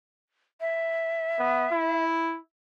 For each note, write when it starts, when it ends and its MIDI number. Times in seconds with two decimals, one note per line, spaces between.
0.61 2.05 76
1.39 1.66 59
1.71 2.38 64